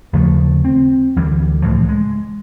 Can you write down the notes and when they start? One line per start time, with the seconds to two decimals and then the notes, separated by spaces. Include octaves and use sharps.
0.13 D#2 C#3 F3 A3
0.65 C4
1.16 D2 E3 G3
1.62 C#2 A2 E3 F3
1.88 G#3